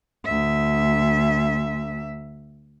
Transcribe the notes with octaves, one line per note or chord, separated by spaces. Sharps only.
D2 E5